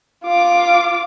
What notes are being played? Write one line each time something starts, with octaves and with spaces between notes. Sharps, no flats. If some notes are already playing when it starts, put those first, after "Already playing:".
F4 D6